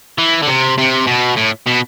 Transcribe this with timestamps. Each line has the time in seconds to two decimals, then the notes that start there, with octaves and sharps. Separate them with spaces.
0.18 E3
0.42 D3
0.47 C3
0.78 C3
1.07 B2
1.37 A2
1.67 B2